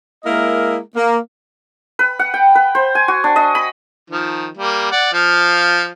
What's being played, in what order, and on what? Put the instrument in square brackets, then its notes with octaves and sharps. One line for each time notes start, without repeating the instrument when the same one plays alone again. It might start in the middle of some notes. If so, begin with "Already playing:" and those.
[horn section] G#3 A#3 E4 A#4 D#5 E5
A#3
[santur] B4
F#5
G5
B4
C5
G#5
F#4
D4
D#5
B5
[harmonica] D#3 F3
G3 A#3
D5 F#5
F3 F5